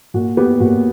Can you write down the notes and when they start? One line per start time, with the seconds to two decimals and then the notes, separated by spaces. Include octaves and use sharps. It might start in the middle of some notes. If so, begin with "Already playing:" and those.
0.14 A#2 F#4
0.37 B3 G4
0.60 A#2 F#4